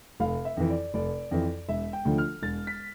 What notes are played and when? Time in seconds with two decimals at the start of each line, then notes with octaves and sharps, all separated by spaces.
0.20 F1 F5
0.45 E5
0.57 F2 E3
0.70 D5
0.94 F1 D5
1.31 F2 E3
1.68 E1 E5
1.93 G5
2.05 D2 D3 F3
2.18 F6
2.42 E1 A6
2.67 B6